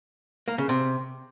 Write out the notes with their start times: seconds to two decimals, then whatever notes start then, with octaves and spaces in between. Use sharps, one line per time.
0.48 A#3
0.58 C#3
0.69 C3